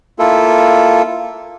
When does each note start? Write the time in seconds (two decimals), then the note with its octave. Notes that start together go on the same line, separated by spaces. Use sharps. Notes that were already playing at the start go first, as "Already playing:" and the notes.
0.19 A#3 E4 F4 A4